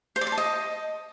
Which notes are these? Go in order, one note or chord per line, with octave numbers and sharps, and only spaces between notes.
C5
D5
C6
A5
D#5